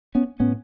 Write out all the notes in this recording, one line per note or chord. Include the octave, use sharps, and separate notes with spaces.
B3 C#4
A2 B3 C#4